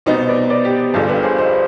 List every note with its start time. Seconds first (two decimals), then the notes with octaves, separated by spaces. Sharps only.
0.06 C2 B2 B3 D#4 C5 D#5
0.28 B4 D5
0.50 B4 D5
0.65 G4
0.80 G4
0.94 G1 G2 D3 F4 G#4
1.08 G4 B4
1.23 G#4 C5
1.38 C5 D#5